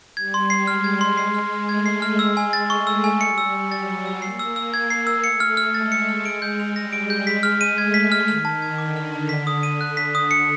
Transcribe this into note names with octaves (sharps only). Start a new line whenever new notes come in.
G3 G#6
C6
C7
G#3 F6
G#6
C6
G#3 C7
F6
F6
A3 G#6
C7
F6
G#3 E6
G#5
A6
A3 C#6
E6
G#5
G3 C#7
E6
E6
F#3 A6
C#7
E6
A#3 C7
E6
E6
G#6
C7
E6
A3 C#7
F6
F6
G#3 A6
C#7
F6
D7
G6
F7
G3 A#6
D7
G6
G#3 B6
F6
D#7
A3 G#6
B6
F6
D#3 F6
A5
G#6
D3 D6
F6
A5
B6
D#6
D#7
D3 F#6
B6
D#6
C#7